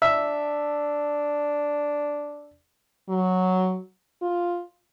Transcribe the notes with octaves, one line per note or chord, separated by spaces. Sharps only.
D4 E5
F#3
F4